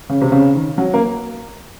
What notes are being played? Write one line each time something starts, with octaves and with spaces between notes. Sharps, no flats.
C#3
C3
C#3
D#3
F#3
A#3